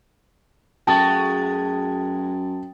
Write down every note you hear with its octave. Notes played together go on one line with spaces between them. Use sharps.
F#2 G#3 A3 F#4 G5 A5 D#6 A6